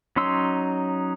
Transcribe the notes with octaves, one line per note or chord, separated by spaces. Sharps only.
F#3 C#4 D#4 C6 E6